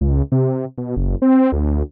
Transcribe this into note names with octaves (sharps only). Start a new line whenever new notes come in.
C#2
C3
B2
F#1
C4
D2